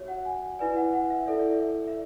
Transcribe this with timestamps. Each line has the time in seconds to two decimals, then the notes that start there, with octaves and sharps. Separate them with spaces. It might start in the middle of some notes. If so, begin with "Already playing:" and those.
Already playing: F#4 C#5 E5
0.08 F#5
0.25 G#5
0.59 E4 B4 D5 G#5
0.77 F#5
0.94 F#5
1.10 E5
1.26 E4 A4 D5 E5
1.39 D5
1.53 E5
1.88 E5